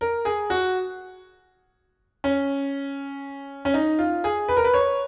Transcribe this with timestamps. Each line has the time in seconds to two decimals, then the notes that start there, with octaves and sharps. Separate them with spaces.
0.01 A#4
0.25 G#4
0.50 F#4
2.24 C#4
3.65 C#4
3.74 D#4
3.99 F4
4.24 G#4
4.48 B4
4.57 A#4
4.64 B4
4.74 C#5